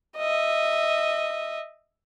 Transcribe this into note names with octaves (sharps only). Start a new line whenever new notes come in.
D#5 E5